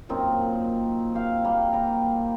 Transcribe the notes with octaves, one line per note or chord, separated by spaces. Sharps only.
F#2 A#2 C4 D#4
G4 F5
G3 A#3
G3 G5 A#5